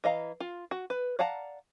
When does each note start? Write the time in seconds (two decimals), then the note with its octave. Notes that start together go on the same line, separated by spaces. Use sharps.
0.04 E3 D#5 F5 A#5
0.40 F4
0.71 F#4
0.90 B4
1.19 D5 F5 F#5 A5 A#5